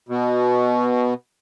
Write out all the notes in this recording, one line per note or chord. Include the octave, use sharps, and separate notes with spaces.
B2